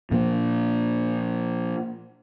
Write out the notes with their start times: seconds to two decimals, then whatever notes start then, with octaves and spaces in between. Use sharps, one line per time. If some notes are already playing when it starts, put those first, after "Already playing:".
0.11 A#2 F3 A#3